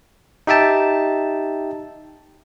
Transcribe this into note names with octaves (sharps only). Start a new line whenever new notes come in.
D#4 G4 E5 G5 A5